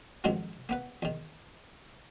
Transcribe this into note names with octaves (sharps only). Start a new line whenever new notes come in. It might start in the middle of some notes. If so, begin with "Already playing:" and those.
F2 G#2 D#3 F#3 G#3 A#3
A#3 B3 B4
E2 D#3